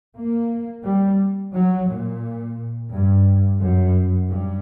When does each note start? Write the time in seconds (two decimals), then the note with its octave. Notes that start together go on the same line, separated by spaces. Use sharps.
0.16 A#3
0.85 G3
1.53 F#3
1.88 A#2
2.91 G2
3.60 F#2
4.29 G2